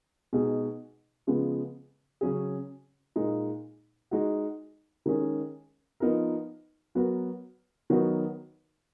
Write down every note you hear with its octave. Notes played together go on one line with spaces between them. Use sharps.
B2 G#3 D#4 G#4
C#3 F3 G#3 B3
C#3 F#3 C#4 G#4
A#2 G#3 D#4
G#3 D#4 F#4
D#3 G#3 C#4 G#4
F3 B3 D#4 A#4
F#3 B3 F#4 A#4
D#3 F#3 B3 D#4 F#4